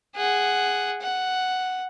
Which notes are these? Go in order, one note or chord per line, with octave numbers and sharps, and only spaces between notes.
G#4 F#5
F#5